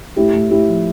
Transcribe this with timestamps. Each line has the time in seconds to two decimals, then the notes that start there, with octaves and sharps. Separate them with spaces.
0.16 A2 E4 G4
0.33 A2
0.50 A2 E4 G4
0.68 F3